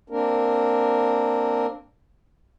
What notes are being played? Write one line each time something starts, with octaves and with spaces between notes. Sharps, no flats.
A#3 C4 D4 A#4